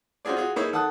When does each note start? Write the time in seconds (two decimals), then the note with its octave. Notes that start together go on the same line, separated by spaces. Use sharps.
0.25 C4 C#4 F4 F#4 G#4 D5
0.37 F4 F#4 G#4
0.56 A#3 D#4 E4 G#4 C#5 E5
0.73 D#3 A4 F#5 A5 D#6 F#6